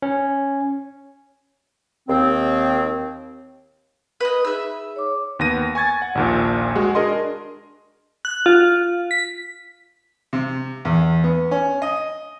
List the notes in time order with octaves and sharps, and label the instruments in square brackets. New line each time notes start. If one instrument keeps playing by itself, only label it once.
[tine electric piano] C#4
[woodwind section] D#2 C4
[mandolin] B4 D#5
[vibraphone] D#4 G#4 [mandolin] E5 E6
[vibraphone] C#5 D6
[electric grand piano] D#2 B3 A#6 D#7
G#5 C#6 G#6 A6
F#5
A#1 D#2 A#2
G#3 F#4
D4 G#4 A#4 D#5 C6
[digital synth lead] F#6
F4
B6
[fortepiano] C3
E2
B3
C#4
D#5